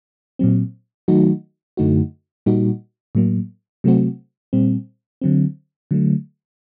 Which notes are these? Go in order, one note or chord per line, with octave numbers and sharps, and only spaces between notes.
A#2 F#3 C4
D#3 F#3 A3 D#4 F#4
F#2 D3 A3 D#4 F#4
A#2 G3 A#3 D#4 F#4
A2 F#3 A#3
C3 F#3 A3 C4 F#4
A#2 G3 C4
D3 F#3 C4
D3 F#3 A3